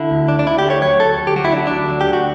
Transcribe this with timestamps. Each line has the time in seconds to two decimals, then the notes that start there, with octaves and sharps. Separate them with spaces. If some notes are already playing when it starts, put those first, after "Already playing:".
Already playing: D3 E4
0.11 D2
0.28 D4
0.39 D4
0.46 D2 E4
0.59 G4
0.64 A3
0.70 C#5
0.82 F#3 C#5
1.00 D2 A4
1.19 D2
1.27 G4
1.36 F#3 F#4
1.45 E4
1.52 F#3 D4
1.67 D2 D4
1.89 F#3
2.01 G4
2.07 D2
2.13 F#4